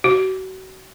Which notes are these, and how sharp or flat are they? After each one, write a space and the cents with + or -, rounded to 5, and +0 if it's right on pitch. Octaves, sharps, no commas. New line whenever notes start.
F#4 +30